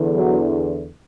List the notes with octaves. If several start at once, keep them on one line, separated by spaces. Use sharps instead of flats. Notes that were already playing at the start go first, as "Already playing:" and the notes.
Already playing: E2 D3
F#3